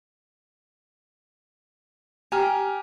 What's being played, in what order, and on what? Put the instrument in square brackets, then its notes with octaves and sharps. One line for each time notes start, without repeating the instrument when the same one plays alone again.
[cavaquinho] G4 [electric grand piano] G#5 A#5 F6